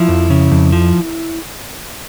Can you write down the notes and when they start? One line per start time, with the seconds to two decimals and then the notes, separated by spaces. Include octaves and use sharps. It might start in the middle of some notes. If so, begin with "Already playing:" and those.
Already playing: F3 E4
0.08 F2
0.30 C#3
0.51 F2
0.72 F3